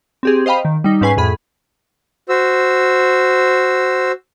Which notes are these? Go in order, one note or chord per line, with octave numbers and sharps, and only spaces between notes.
C4 G4 G#4
C5 D#5 F5 G5 B5
D#3
G3 D#4
G#2 C#4 B4 G#5 C7
F2 A2 G#4 B5
F#4 C5 E6